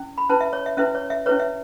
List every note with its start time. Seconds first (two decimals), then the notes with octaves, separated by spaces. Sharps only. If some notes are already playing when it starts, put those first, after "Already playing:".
Already playing: C#4 E4
0.18 B5
0.29 C#4 E4 B4 A5
0.41 E5
0.53 C#5
0.66 E5
0.77 C#4 E4 B4 E5
0.95 C#5
1.10 E5
1.26 C#4 E4 B4 C#5
1.40 E5